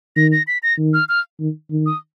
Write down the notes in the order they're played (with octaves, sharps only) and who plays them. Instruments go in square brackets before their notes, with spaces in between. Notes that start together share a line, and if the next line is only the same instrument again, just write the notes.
[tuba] D#3 [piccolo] A#6
[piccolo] A#6
B6
A#6
[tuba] D#3
[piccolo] F6
F6
[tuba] D#3
D#3
[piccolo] D#6